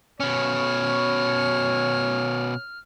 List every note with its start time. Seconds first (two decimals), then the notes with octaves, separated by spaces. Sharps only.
0.20 B2 C#4 C#5 F6